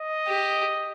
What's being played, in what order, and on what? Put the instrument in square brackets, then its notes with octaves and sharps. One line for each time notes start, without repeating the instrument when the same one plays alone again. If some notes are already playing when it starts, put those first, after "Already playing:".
Already playing: [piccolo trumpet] D#5
[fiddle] G4